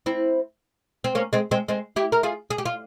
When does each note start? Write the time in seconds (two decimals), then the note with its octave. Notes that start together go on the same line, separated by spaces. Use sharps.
0.06 C4 E4
1.04 C4
1.15 A#3 C#4
1.33 G#3 C4
1.51 G#3 C4
1.68 G#3 C4
1.96 E4 G4
2.12 A#4
2.23 F4 G#4
2.50 G#4
2.58 G4
2.66 F4